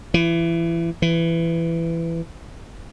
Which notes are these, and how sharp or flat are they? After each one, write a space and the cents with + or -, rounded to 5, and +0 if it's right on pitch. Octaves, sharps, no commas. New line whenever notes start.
E3 +25
E3 +15